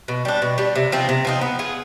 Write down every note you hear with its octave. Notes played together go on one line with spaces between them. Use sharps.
B2
G3 D4
B2
G3 D4
C3
F3 C4 D#4
C3
F3 C4 D#4
B3
F4 G#4